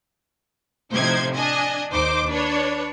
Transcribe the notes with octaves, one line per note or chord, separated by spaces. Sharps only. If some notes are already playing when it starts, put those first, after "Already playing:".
A2 C3 F3 D#4 C5 G#6
D4 D#5 G#5
D#2 D#4 C5 D6
D4 B4 C#5